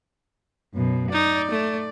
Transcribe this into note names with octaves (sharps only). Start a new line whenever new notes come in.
F#2 B2
D#4 D5
A3